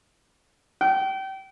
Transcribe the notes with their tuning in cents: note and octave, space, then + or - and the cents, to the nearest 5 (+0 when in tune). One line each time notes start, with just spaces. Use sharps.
G5 -30